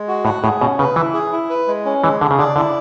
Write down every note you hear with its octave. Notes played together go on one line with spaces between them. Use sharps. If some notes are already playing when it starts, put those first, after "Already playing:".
Already playing: G#3
F#4
A2 F#5
A2 G#4
B2 C#4
C#3 B4
E3 E4
G#4
E4
B4
G#3
C#4
E3 G#3
D3 G#4
C#3
D3 D5
D3 E4